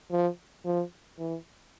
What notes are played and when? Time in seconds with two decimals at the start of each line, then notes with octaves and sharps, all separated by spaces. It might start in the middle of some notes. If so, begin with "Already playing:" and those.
0.11 F3
0.65 F3
1.19 E3